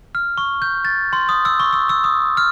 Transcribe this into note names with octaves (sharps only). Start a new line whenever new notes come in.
F6
C#6
G6
A6
C6
D#6
E6
C#6
E6
E6
D#6
F6